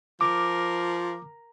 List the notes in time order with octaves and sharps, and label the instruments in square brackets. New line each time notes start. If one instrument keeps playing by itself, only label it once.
[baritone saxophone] F3 [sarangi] A#4 [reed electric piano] D6